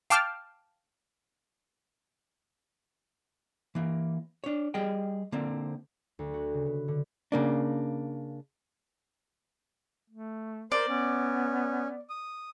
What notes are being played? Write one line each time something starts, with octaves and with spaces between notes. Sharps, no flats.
F5 G5 A5 D6 F6
E3 A#3
D4 C#5
G3 G#4 D#5 G5
D3 A#3 C4
D2
F#4
C#3
B3
D3
C#3 A#3 D4
A3
A#4 C5 D5 C6
B3 C#4
D#6